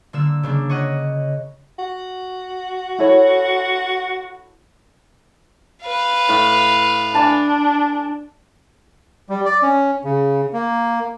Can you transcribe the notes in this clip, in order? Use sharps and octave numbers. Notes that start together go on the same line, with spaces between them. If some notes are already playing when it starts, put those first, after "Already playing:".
D3 A#3 E6
C#3 A#3 D4
C#5 D#5 F#5
F#4
E4 A4 C#5
B4 F5
A2
D4 D5 G#5 A5
G3
D5
C#4
C#3
A#3